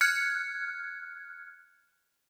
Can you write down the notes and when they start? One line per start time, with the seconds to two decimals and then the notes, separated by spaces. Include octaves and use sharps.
0.01 F6 F#6 G#6 C#7